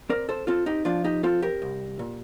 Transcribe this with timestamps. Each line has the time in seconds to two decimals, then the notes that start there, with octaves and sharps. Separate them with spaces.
0.09 C4 A#4 D5
0.29 A4 C5
0.47 C4 F4 A4
0.66 D#4 G4
0.85 F3 D4 F4
1.04 D#4 G4
1.23 C4 F4 A4
1.42 G4 A#4
1.62 C2
1.99 A#2